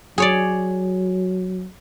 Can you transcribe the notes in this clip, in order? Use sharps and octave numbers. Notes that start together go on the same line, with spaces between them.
F#3 G#4 C#5 D5